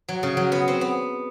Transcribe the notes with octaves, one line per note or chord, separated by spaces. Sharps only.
F#3
C#3
F#3
B3
C4
B3